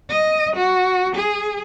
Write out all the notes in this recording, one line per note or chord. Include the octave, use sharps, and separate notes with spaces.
D#5
F#4
G#4